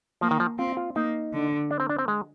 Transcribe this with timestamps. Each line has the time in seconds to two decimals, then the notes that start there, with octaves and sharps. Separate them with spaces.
0.21 F3 A#3
0.31 D#3
0.40 F3
0.58 C4 F4
0.77 F4
0.96 A#3 D#4
1.33 D3
1.71 D4
1.80 C4
1.89 D4
1.99 C4
2.08 G#3